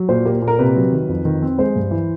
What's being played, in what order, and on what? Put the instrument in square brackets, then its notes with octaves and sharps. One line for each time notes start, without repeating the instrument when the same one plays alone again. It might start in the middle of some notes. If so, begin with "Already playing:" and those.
Already playing: [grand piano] F#3
[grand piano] A#2 [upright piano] C5
[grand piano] A#3 [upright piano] G4
[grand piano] A#2
[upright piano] A#4
[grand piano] C3 [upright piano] B4
[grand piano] F#3
D#3
F2
D#3
C4
[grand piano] G#3 [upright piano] C5
[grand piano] G2
E3